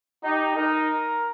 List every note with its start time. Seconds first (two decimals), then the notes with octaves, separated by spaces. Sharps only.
0.24 D#4 G4
0.56 D#4 A#4